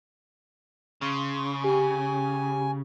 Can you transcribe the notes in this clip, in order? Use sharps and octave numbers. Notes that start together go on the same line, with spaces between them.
C#3 C6
G4 G#5